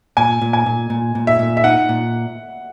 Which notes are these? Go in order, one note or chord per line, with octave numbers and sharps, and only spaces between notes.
A#2 G#5
A#2
G#5
A#2
A#2
A#2
E5
A#2
E5
D#4 F#5
A#2